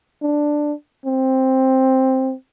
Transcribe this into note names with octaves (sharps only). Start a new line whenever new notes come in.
D4
C4